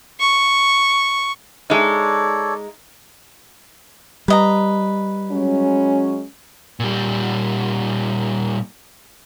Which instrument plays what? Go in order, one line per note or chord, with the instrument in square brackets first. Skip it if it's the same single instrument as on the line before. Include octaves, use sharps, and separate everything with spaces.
[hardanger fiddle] C#6
[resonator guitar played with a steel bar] G#3 D#4 [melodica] A4 C#5 D5
[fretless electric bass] G3 [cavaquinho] B4 D#5 A#5
[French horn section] F#3 G#3 C#4
[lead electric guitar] A#2 G3